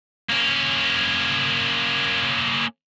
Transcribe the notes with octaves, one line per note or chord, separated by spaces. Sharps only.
A#3 C#4